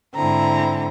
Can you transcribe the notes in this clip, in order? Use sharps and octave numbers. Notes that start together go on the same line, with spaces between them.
G#2 D3 C4 E4 A#5